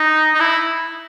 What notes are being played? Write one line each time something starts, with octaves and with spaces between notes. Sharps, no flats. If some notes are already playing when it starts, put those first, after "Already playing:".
Already playing: D#4
D#4
E4